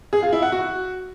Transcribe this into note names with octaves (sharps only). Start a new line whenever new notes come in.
G#4
F4
E4
F#5
F#4